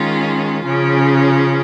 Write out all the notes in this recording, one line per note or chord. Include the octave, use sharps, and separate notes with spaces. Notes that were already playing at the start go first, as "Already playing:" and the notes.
Already playing: D#3 G#3 C#4 F4
C#3 F3 C#4